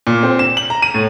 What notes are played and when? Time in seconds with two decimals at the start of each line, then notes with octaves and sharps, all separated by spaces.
0.07 A#2
0.23 C4
0.39 E7
0.57 F#7
0.70 A#5
0.82 D#7
0.94 A2